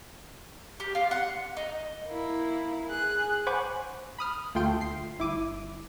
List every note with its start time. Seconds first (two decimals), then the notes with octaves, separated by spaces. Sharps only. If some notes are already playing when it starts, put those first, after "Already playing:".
0.80 G4
0.95 F4
1.11 F#5
1.57 D#4
2.06 A#3 E4
2.88 G#4 F#6
3.46 C5 F#5 G#5 B5 C#6 D6
4.19 B5 D#6 F6
4.54 D2 A3 F4 G5 C6 D7
4.81 C7
5.18 G1 E4 D6 D#7